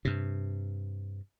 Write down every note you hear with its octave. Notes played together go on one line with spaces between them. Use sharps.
G2 C3